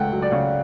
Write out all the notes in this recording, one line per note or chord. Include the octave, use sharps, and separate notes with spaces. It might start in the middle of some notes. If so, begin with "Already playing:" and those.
Already playing: C#2 C#3 A3 F#5 G5
F#3
D5
C#3